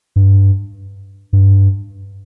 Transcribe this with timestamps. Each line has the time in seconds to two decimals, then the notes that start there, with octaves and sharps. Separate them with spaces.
0.16 G2
1.33 G2